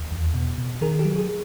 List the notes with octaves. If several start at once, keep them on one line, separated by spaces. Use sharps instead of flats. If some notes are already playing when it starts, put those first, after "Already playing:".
Already playing: D#2
E2
B2
B2
D#3 G#4 A#4
G4 A4
F#3
G#4